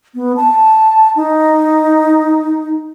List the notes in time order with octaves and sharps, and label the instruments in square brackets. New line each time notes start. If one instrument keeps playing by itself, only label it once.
[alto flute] B3
A5
D#4